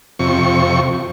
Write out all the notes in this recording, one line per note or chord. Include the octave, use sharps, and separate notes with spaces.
F2 C3 C#6